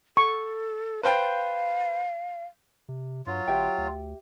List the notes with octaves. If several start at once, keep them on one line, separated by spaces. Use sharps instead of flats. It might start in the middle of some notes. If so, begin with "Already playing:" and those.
A4 C#6
B4 C5 F5 G5
C3
G2 F#3 F4
G1 G4 E5 G5
D2